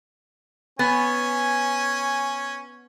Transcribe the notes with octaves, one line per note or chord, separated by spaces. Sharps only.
B3 C#4 G#5